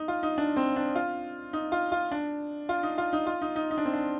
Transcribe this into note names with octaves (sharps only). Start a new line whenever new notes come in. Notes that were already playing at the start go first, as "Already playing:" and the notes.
Already playing: D#4
F4
D#4
D4
C4
D4
F4
D#4
F4
F4
D4
F4
D#4
F4
D#4
F4
D#4
D#4
D#4
D4
C4
D4